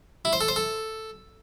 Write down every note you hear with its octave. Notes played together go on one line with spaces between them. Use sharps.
E4
C5
A4
C5
A4